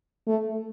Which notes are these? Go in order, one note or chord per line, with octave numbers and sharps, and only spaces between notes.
A3